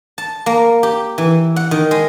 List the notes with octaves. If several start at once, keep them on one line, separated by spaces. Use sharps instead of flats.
A5
A#3
G4
E3
F#5
D#3
G#3